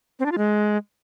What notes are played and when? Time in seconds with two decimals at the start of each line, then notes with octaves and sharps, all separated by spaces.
0.19 C4
0.26 D4
0.32 F4
0.38 G#3